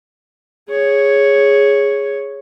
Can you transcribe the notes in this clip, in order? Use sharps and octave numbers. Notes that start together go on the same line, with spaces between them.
G#4 C#5